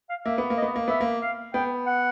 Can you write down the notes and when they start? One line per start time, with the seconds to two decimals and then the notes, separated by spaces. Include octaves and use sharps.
0.10 F5
0.25 A#3 E5
0.38 B3
0.50 A#3
0.58 D#5
0.62 B3
0.76 A#3
0.88 B3 E5
1.01 A#3
1.22 F5
1.54 B3 G5
1.86 F#5